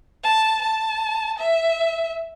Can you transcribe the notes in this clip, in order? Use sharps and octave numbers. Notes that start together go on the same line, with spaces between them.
A5
A5
E5